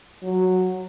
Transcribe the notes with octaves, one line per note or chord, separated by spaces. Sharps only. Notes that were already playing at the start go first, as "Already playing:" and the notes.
F#3